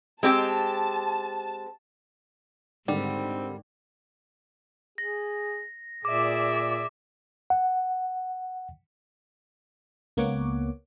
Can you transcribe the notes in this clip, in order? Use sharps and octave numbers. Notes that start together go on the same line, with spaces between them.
G#3 C4 G4 A5
G#2 D3 D#3 G3 C4
G#4 A#6
A#2 G#4 D5 E5 D6
F#5
C#2 A#3 B3 C#5 F#5 D6